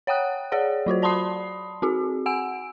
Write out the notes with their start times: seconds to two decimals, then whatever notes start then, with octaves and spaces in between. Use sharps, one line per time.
0.07 C#5 F#5 G5 D#6 F#6
0.52 G#4 C#5 D5 F#5
0.86 F#3 F4 F#4 C5
1.02 D5 A5 B5 C6 D#6 C7
1.82 C4 F#4 G#4
2.26 F#5 G#5 E6 D7